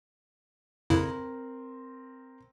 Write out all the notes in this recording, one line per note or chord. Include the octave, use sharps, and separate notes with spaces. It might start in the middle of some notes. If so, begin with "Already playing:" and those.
F2 C#3 C4 E4 A#4